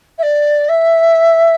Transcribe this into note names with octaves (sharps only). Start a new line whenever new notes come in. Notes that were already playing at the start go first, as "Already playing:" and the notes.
E5
D5
E5